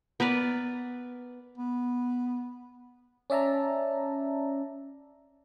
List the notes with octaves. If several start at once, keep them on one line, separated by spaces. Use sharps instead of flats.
B3 A#4 B4 D5
B3
C#4 D5 E5 A5 A#5